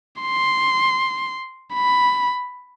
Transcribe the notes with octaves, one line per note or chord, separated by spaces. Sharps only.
C6
B5